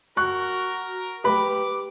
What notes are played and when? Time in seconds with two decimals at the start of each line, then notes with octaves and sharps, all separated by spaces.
0.17 F#4 A#4 C#6 F#6
1.24 G4 B4 B5 D6